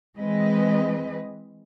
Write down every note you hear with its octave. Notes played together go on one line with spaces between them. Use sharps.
E3 G#3 C4 B4 D#5